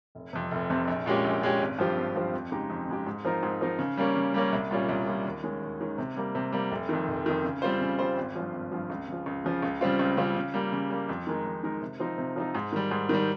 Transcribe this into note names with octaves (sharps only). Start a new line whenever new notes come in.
F1
F2 C3
F1
F2 C3
A#1
A#2 G#3 C#4 G4
A#1
A#2 G#3 C#4 G4
G#1
G2 F3 C4 G4
G#1
G2 F3 C4 G4
F2
C#3 G#3 D#4 G4
F2
C#3 G#3 D#4 G4
G#2
F3 C4 D#4 A#4
G#2
F3 C4 D#4 A#4
C#3
G3 A#3 C#4
C#3
G3 A#3 C#4
C2
A#2 G3 C#4 F4
C2
A#2 G3 C#4 F4
D#2
D#3 G#3 C#4
D#2
D#3 G#3 C#4
C3
G3 A#3
C3
G3 A#3
F1
F2 D#3
F1
F2 D#3
C#3
G3 C4 F4 C5
C#3
G3 C4 F4 C5
G#1
G2 F3
G#1
G2 F3
C#2
C#3 F3
C#2
C#3 F3
C#2
C#3 G3 C4 F4
C#2
C#3 G3 C4 F4
C#3
G3 A#3
C#3
G3 A#3
F2
D#3 G#3 D#4 A#4
F2
D#3 G#3 D#4 A#4
C3
F3 C4 D#4
C3
F3 C4 D#4
G#2
D#3 G3
G#2
D#3 G3